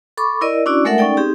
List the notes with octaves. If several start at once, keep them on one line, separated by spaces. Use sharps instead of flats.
A4 B5 C#6 D6
E4 A#4 D5 D#5
C#4 D4 E4 F#4 D5
G#3 A3 A4 A#4 E5 F#5
C#4 D#4 A4 D5 G5
C4 D#4 G4 G#4